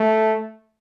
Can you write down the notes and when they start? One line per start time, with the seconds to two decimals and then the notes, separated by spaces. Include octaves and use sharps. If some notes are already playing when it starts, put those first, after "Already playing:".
Already playing: A3